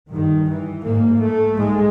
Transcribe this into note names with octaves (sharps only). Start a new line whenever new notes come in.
G2 D#3
E3
G#2 A#3
A3
G#2 G#3